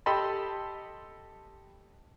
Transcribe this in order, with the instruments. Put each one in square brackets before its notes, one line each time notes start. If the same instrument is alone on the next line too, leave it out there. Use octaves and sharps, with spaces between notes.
[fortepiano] G4 A4 D#5 A5 B5 C6